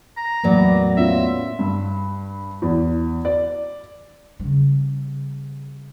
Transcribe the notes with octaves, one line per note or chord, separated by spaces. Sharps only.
A#5
E2 A2 F#3 A#3 B4 D5
B3 C#4 F4 E5
G2
E2
D5
C#3 G3